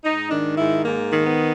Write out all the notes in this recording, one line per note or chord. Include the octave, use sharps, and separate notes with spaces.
G#2 D#4
D#3 D4
G#2 E4
G#2 A#3
D#3
B3